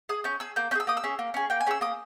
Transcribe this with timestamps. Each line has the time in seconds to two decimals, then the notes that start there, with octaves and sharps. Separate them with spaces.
0.09 G#4 D#6
0.24 C#4 G6
0.40 G#4 E6
0.56 A#3 G6
0.71 C#4 G6
0.75 G#4 E6
0.87 A#3 D#6
0.97 E6
1.04 C#4 G#4
1.19 A#3
1.34 C#4 G#4
1.50 A#3 G5
1.60 G#5
1.67 C#4 G#4 E6
1.81 A#3 D#6